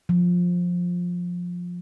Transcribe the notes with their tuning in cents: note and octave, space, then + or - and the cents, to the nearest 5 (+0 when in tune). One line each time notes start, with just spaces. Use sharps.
F3 +15